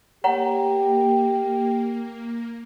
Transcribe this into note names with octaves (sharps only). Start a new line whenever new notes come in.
A#3 G4 C#5 F#5 A#5